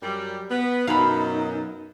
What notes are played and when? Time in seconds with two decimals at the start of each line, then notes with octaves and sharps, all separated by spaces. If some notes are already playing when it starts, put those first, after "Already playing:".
0.02 F#2 G3
0.51 B3
0.87 F#2 B2 D#4 F5 B5